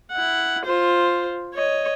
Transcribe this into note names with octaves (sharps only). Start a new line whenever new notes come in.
E4 F#5
F4 C5
C#5 D#5